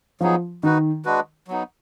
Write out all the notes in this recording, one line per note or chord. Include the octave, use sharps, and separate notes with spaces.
F3 F#3 B3 D#4 G#4
D#3 D#4 F#4 B4
G#3 D4 F#4 B4
F#3 B3 D#4